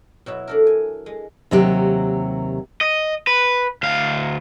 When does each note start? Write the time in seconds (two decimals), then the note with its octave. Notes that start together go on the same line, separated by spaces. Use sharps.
0.26 B2 F#3 E4
0.48 D4 A4 A#4
0.67 G#5
1.06 G#3
1.51 D#2 C3 F#3 G4
2.81 D#5
3.27 B4
3.83 D2 F5